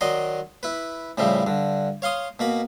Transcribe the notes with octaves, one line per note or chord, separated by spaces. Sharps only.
D#3 F#3 D5 D#5 C6
E4 B4
A2 C#3 F3 G3 E4
G2 D3
C#5 F5 C6 D#6
B2 A#3 B5